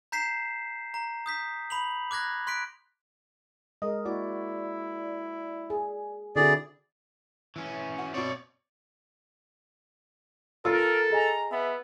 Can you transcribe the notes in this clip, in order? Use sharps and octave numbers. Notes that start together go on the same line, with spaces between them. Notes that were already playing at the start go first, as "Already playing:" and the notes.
A#5 G6 B6 C7 E7
A#5
D#6 G6 B6
B5 F7 F#7
D6 F#6 G#6 A#6
C6 F#6 B6 D7
G#3 A#4 D#5
A#3 E4 F#4 D5
G#4
D3 C4 E4 F#4 G#4 A4 D5
E3 C#4
F#4
B2 C4 C#5 D5
F4 A4 A#4 E6
G#4 D#5 G#5 A#5
B3 E5